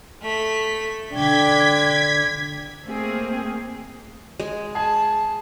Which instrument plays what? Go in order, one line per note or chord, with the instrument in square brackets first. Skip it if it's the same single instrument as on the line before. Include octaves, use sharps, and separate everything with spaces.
[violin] A3 B6
[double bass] D3 D4 [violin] G5 D6 [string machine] G#6 B6
[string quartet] A3 A#3 C4 G#4
[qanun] G#3
[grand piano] G#4 G#5 [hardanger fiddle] A5